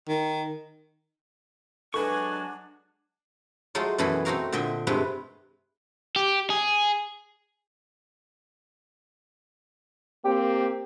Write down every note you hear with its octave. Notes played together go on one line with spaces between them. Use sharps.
D#3
F#3 G#3 D4 F#4 A4 B4 G#5 C#6
F#3 G#3 A3 D#4 F4
F#2 B2 E3 A3 G#4 B5
A3 C4 D#4 F#4 A#4 F5
A#2 D3 D#5 E5 G5 C6
G2 C3 G#3 A3 C4 B4
G4
G#4
A#3 C4 G4